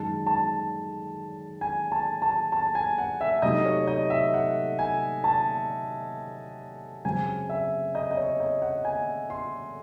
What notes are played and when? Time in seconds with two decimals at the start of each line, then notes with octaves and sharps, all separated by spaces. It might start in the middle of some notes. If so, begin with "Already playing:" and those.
Already playing: F#2 D#3 G#3 D#4 A5
0.27 A5
1.61 G#5
1.92 A5
2.22 A5
2.52 A5
2.75 G#5
2.98 F#5
3.21 E5
3.42 C3 F#3 A3 D#4 D#5
3.65 C#5
3.87 D#5
4.10 E5
4.34 F#5
4.79 G#5
5.24 A5
7.05 F#2 C#3 F#3 C4 G#5
7.49 E5
7.95 D#5
8.11 D#5
8.17 C#5
8.40 D#5
8.62 F#5
8.85 G#5
9.30 C6